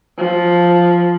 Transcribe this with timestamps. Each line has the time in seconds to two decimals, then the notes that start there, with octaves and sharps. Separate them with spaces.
0.18 F3